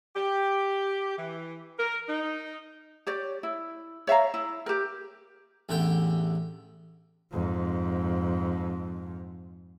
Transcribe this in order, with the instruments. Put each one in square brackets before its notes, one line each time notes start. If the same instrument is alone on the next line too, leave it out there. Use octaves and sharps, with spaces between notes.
[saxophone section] G4
E3
A#4
D#4
[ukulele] G4 C#5 D5
E4
C#5 E5 F5 A#5
E4
G4 A#4
[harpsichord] A1 E2 D3 G4 G5
[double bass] F2 G#2